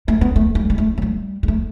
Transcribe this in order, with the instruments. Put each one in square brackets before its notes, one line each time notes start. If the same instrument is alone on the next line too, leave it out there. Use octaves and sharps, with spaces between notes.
[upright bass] A3
B3
A3
G3
G3
A3
F#3
G3
G3
A3